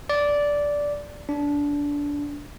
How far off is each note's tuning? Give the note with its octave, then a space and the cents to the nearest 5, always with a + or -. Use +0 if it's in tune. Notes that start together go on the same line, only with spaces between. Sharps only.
D5 -10
D4 -20